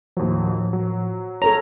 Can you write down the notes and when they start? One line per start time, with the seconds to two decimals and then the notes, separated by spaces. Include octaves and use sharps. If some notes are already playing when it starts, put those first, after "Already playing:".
0.17 D#2 A2 F3 F#3
0.73 F#3
1.42 A4 A#4 C#5 A#5